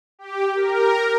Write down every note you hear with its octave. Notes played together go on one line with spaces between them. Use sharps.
G4
A#4